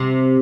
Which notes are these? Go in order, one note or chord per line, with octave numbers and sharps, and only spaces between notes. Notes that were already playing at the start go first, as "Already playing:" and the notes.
Already playing: C3